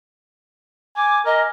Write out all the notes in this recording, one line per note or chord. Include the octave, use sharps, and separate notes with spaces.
G#5 D6
A#4 D#5